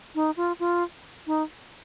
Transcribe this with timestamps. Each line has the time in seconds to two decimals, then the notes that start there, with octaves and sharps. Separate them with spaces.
0.15 D#4
0.37 F4
0.60 F4
1.27 D#4